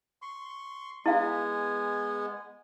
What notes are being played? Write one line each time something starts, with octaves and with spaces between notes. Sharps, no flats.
C6 C#6
G#3 B3 E4 F5 G#5